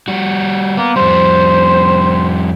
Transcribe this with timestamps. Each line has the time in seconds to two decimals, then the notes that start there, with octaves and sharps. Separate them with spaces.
0.08 G3 F#4
0.77 A#3 B3
0.96 F2 G3 C5